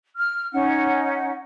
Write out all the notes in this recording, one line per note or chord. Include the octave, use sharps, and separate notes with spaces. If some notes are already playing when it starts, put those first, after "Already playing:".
F6
C#4 D#4 F#5